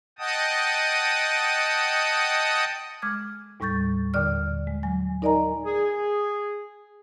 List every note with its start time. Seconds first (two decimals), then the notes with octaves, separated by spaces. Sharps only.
0.19 D#5 F#5 G5 A5 D#6
3.02 G#3 D6 F6 G#6
3.60 D#2 A2 G3 C#6 G6 A6
4.14 D#2 A#2 D3 D5 F6
4.67 G#3
4.83 F#3 G#5
5.22 D#4 A#4 D5 D#5 G#5 A#5
5.64 G#4